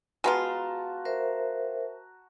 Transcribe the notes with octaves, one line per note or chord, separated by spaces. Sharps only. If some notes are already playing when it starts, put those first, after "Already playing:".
G#3 B3 F4 F#4 A5 A#5
A#4 C5 E5